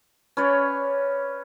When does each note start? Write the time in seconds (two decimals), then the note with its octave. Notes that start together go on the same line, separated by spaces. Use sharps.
0.37 C#4 B4 C#5 D5